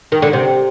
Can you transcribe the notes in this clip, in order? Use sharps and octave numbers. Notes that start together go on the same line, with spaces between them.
D#3
D3
C3